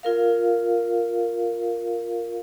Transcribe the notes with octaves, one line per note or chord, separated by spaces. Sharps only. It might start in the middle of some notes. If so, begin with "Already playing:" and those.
F4 A#4 F5